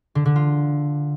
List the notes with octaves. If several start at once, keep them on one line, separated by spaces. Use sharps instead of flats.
D3
D3
F4